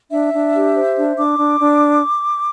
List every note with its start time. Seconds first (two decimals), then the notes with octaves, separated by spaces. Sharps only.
0.11 D4 E5
0.33 D4
0.54 G4
0.75 C5
0.96 D4
1.17 D4 D6
1.38 D4
1.59 D4